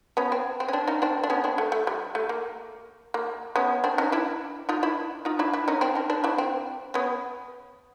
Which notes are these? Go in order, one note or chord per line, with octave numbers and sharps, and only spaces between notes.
B3 C#4
C4
C4
C#4
C4 D4
C#4 D#4
C4 D4
D4
B3 C#4
C4 D4
A3
A3
G3
A3
A#3
A#3
B3 C#4
C4 D4
C#4 D#4
D4 E4
D#4 F4
D4 E4
D#4 F4
D4 E4
D4 E4
C#4 D#4
C4 D4
C#4 D#4
C4 D4
D4 E4
C4
B3 C#4